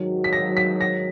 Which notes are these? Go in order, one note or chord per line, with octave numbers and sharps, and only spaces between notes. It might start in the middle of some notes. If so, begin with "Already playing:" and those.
Already playing: G#2 D#3 F#3
B6
A#6
B6
A#6